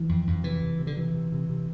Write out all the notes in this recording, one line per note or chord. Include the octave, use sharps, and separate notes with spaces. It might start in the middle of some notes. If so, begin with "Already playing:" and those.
Already playing: E3
F2
F2
C3 E3
C3
C3
D3
C3 E3
C3
C3
C3